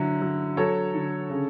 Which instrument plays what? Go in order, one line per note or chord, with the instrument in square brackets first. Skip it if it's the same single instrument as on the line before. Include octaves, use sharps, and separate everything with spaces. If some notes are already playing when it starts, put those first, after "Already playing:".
Already playing: [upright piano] D3 F#3 E4
F#3
F#3 A4 C#5
D3
C#3